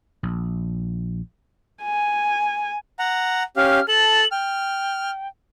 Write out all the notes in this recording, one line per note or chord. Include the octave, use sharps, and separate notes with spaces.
A#1
G#5
F#5 A#5
C#4 G4 F5 F6
A4 A5 F#7
G5 F6